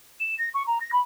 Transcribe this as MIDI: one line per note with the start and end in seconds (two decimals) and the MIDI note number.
0.19 0.34 100
0.38 0.47 94
0.54 0.65 85
0.66 0.78 82
0.80 0.92 94
0.92 1.00 83